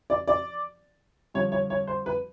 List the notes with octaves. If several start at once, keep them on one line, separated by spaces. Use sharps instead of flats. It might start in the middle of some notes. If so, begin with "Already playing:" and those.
D5
D5
G2 D3 F3 C#5
C#5
C#5
C5
B4